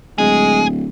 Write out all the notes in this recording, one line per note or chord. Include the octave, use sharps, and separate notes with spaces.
D1 G#3 G#4